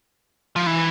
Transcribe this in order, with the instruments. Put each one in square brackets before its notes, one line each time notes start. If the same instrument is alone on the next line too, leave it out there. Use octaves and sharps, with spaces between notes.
[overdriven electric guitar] F3
E3